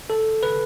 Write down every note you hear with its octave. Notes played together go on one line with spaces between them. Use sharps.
A4
B4